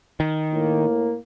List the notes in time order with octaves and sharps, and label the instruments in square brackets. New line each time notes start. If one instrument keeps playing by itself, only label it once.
[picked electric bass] D#3
[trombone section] A2 A#3